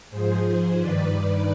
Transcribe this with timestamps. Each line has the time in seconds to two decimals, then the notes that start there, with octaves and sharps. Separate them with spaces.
0.11 G#2 F3 G#4 C5
0.44 G#4 C5
0.78 G2 D#3 B4 D5